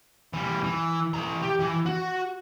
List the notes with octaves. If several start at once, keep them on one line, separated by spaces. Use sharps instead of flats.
E3 G3
E3
E3 A#5
G4
E3
F#4